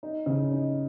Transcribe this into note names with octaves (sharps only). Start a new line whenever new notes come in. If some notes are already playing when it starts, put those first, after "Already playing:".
D#4
C#3
D#4